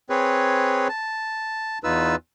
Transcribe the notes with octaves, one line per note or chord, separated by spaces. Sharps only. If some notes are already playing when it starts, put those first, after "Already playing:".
C4 G#4 B4 C#5
A5
E2 D#4 F4 B4 E6